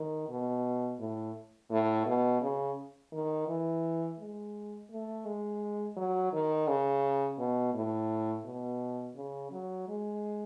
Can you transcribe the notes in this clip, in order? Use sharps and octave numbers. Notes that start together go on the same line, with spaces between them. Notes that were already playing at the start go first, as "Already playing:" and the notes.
Already playing: D#3
B2
A2
A2
B2
C#3
D#3
E3
G#3
A3
G#3
F#3
D#3
C#3
B2
A2
B2
C#3
F#3
G#3